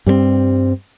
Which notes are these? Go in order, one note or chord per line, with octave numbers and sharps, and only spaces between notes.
G2 G3 A#3 C4